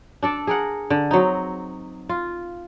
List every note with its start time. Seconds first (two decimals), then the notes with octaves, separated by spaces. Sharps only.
0.22 D4 A4 D5
0.47 G#4 A#4 F#5
0.90 D3
1.11 F#3 C4 D#4
2.09 F4